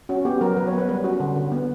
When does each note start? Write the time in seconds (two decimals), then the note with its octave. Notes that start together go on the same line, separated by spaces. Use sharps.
0.09 C#4 F#4
0.25 B3 G4
0.41 F#3 A#4
0.57 F#3 B4
0.67 C#5
0.73 B3
0.78 B4
0.89 G3 B4
1.04 C#4 F#4
1.20 D3
1.36 D3
1.52 B3